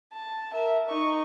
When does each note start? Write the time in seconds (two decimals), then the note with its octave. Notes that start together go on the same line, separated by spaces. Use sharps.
0.13 A5
0.53 A#4 E5
0.87 D#4 C#6